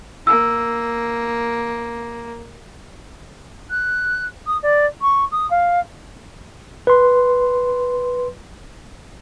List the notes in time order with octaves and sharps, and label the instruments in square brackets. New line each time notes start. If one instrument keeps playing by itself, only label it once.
[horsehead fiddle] A#3 [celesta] E6
[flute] F#6
D#6
D5
C#6
D#6
F5
[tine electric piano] B4 C6